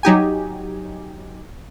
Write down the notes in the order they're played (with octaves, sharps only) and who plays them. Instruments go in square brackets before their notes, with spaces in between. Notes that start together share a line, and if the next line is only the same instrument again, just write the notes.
[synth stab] F#3 D#4 G4 G#5